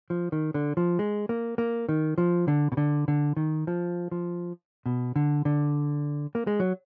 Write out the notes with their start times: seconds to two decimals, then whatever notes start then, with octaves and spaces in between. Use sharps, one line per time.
0.10 F3
0.32 D#3
0.54 D3
0.77 F3
0.99 G#3
1.29 A#3
1.58 A#3
1.89 D#3
2.18 F3
2.48 D3
2.72 B2
2.77 D3
3.08 D3
3.36 D#3
3.67 F3
4.11 F3
4.86 B2
5.16 D3
5.45 D3
6.35 A#3
6.47 G#3
6.60 F#3